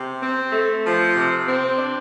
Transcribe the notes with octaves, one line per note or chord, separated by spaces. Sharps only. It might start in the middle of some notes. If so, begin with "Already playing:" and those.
Already playing: C3
C4
A3
F3
C3
C4
D4